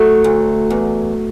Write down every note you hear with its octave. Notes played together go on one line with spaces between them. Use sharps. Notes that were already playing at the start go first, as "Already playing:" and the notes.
Already playing: F#3 A3
D2
E2